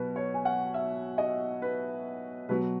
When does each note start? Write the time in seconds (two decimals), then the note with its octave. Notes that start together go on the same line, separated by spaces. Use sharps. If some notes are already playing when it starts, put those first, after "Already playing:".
Already playing: B2 F#3 B4
0.16 C#5
0.34 G#5
0.45 F#5
0.74 E5
1.18 D#5
1.62 B4
2.49 B2 F#3 B4